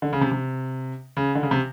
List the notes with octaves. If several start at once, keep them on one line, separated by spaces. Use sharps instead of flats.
D3
C#3
C3
C3
C#3
D3
C#3
C3